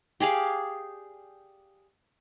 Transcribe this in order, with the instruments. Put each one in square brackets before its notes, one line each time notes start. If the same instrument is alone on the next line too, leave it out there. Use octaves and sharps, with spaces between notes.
[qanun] G4 G#4 D5 F5